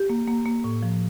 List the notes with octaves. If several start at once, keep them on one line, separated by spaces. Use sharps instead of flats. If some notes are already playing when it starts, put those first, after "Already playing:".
Already playing: G4
A#3
A#3
A#3
A2
F3